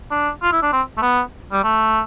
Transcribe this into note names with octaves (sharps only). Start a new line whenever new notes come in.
D4
F4
E4
D4
C4
A3
B3
G3
A3